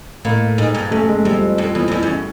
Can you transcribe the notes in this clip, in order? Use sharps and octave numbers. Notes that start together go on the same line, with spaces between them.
A2 A#3
G#2
G2
F#2 A3
G#3
F2 G3
F2
E2
F2
E2
F#2